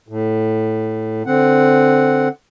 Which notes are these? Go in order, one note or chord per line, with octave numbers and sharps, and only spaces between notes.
A2
D3 C4 F#5